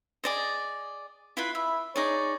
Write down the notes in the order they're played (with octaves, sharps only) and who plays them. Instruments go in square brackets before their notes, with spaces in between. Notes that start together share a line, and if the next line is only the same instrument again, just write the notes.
[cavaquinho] G#4 D5 D#5
E4 F4 B4
[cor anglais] E4 [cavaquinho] E5
[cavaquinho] D#4 G#4 D5 [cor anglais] C#5